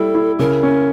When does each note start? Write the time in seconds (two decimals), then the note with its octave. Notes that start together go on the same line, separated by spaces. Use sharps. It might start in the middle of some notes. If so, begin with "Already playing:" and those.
Already playing: G3 E4 A4
0.14 E4
0.39 C#3 A#4
0.63 C#4